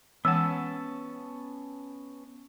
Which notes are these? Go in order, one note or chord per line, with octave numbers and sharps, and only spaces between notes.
E3 G#3 B3 C#4 F#5 A5 E6